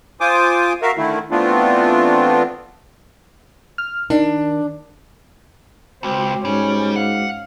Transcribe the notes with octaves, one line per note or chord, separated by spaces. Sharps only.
F4 C5 G#5 D6 D#6
F#4 A#4 E5 F5
D3 D#3 A3 E4
E3 A3 B3 C4 D4 F4
F6
D#3 D4
C#2 G#3 C4 F#4 D6
G#2 G3 C#4
F5 F#5